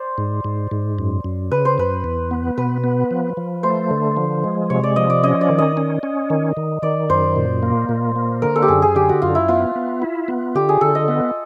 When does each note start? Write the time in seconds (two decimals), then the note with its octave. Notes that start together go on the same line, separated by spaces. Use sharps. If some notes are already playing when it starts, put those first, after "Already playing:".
Already playing: C5 D5
0.18 G#2
0.44 G#2
0.71 G#2
0.99 F#2
1.24 F#2
1.52 C#3 B4
1.65 C5
1.78 F#2 B4
2.04 E2
2.31 B3
2.58 B2 B4
2.84 B3
3.11 F3
3.37 F3
3.63 A3 C5
3.90 D3
4.17 F3
4.44 G#3
4.70 C3 C#5
4.84 D5
4.96 F3 D#5
5.10 D5
5.23 C#4 D#5
5.41 D5
5.49 D#3
5.58 D#5
5.77 C#4
6.03 C#4
6.30 D#3
6.57 D#3
6.82 D#3 D5
7.09 F#2 C5
7.36 A#2
7.63 A#3
7.89 A#2
8.16 A#3
8.42 D3 A#4
8.56 A4
8.62 G4
8.68 F#2 G#4
8.82 G#4
8.95 D3 G4
9.09 F#4
9.22 F#2 F4
9.35 E4
9.48 B3 F4
9.76 B3
10.02 E4
10.28 B3
10.55 D3 G4
10.69 G#4
10.81 D3 A4
10.95 D#5
11.08 B3